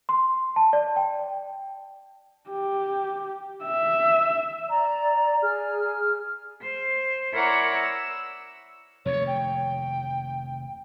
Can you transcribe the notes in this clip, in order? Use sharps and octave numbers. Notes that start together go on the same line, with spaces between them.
C6
A5
D5
G5
G4
E5
D5 A#5
G#4 F6
C5
E4 A#4 C#5 D5 F#5 A#5
E6
F1 D#2 C#5
G5